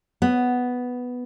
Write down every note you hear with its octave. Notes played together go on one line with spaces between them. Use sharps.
B3